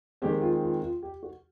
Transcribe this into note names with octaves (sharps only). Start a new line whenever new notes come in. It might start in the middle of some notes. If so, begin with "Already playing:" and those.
D#3 G#3 C4 G4
F4
F4
F4
G4
F#4